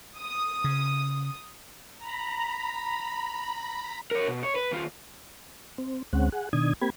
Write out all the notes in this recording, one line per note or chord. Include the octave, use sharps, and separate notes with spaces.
D#6
C#3
A#5 B5
A#4 C#5
B2
C#5
B4
D#2 F4
C4
D2 G#3 C4 C#4 F#5
G#4 F#5
B2 D#3 D4 D#6 G#6
A#3 C4 G4 B5 G#6